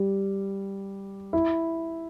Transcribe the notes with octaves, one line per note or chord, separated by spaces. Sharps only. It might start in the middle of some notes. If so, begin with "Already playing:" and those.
Already playing: G3
E4